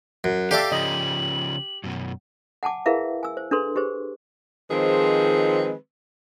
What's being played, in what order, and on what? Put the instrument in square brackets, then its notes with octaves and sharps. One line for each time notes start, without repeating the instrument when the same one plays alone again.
[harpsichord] F#2 [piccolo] F#6
[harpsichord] G4 C6 D6 [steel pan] A4 D5 E5 [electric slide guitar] F5
[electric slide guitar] C#3 F3 C#4 [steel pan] D#5 [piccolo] F#7
[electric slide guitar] F#2 B2
[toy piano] F#5 G#5 A5 D6
E4 G#4 A#4 B4 E5 F5
G#5 E6
C5
D4 G#4 A4 B4 C6
G4 G#4 B4 C5
[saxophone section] D#3 F3 G#3 C4 G#4 B4